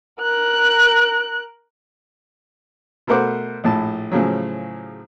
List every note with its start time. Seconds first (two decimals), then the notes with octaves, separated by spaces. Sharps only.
0.21 A#4 F#6
3.07 B2 A3 A#4 C5 F#5 D6
3.64 A#1 A2 A5
4.12 A2 C#3 F3 F#3